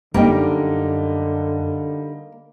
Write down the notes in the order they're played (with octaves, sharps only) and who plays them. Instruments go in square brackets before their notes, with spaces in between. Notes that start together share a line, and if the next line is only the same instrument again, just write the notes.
[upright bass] F#2 E4 [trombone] D3 [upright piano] G3 D#4 [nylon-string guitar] A#3 G5